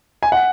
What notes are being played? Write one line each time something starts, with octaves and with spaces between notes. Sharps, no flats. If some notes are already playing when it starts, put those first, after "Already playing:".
G#5
F#5